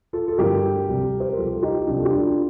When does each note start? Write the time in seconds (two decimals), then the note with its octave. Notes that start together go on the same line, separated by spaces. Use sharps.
0.13 F4 A4
0.28 A4
0.38 G2 D3 A3 G4 A#4
0.88 C2 C3 G3
1.20 C5
1.28 A#4
1.37 C2 C3 G3 F4 A4
1.51 A4
1.62 D#4 G4
1.87 C2 C3 G3 D4 F4
1.98 A4
2.05 G4
2.12 D4 F4